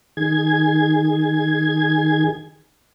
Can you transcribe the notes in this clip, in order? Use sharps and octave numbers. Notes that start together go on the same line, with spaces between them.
D#3 G#4 G#6